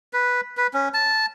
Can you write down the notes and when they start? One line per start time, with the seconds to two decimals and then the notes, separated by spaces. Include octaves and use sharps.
0.13 B4
0.57 B4
0.74 C#4
0.94 A5